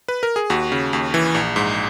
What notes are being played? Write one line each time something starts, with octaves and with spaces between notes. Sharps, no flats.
B4
A#4
G#4
D#2 F#4
C#3
D#2
E3
A#1
G#2